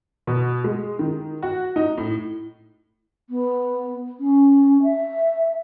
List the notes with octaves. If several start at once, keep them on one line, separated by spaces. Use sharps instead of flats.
B2
G#3
D#3
F#4
D#4
A2
B3
C#4
E5